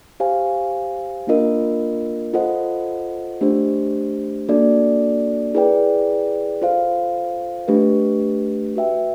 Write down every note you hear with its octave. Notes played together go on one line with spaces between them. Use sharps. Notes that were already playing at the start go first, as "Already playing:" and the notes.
G4 C5 F5 G#5
A#3 D4 F4 A#4 D#5
F4 A4 C5 D#5 F#5
A3 D4 G4 C5
A#3 D4 F#4 A4 D5
E4 G#4 B4 D5 G5
F4 A4 C5 F5
A3 D4 G4 B4
F#4 B4 E5 G5